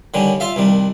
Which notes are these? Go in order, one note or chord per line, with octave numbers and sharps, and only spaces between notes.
D3 D#3 G3 C#4
F4 E5 F5
C2 D#3 G3